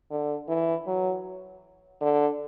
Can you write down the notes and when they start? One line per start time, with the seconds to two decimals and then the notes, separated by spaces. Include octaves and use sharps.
0.11 D3
0.48 E3
0.87 F#3
2.01 D3